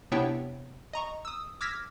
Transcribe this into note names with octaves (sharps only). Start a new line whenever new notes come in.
C3 B3 D4 E4 C#5 G5
D#5 A#5 C#6
D#6 E6
D6 E6 F6 G#6 A#6 B6